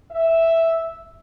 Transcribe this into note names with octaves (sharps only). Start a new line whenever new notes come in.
E5